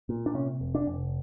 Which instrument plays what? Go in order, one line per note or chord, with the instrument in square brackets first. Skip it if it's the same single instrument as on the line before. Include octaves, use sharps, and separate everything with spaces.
[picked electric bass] A#2
D4
C3 C#4
F1
D4
F1